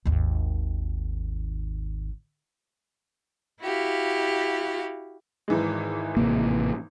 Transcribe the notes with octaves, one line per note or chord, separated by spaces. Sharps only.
G#1 D#2
E4 F#4 G4 F5
G#1 E3 G#3
A1 C3 A#3